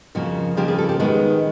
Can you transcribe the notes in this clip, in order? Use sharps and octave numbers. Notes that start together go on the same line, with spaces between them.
F2 C#3 F3 A#3 F#4
F2 C#3 F3 A#3 G4
G#4
A4
G4
D#3 G#3 B3 F#4